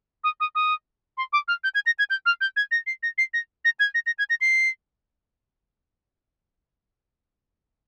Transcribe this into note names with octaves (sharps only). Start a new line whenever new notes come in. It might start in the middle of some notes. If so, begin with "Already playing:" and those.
D#6
D#6
D#6
C6
D6
F6
G6
G#6
A#6
G#6
G6
F6
G6
G#6
A#6
C7
A#6
C7
A#6
A#6
G#6
A#6
A#6
G#6
A#6
C7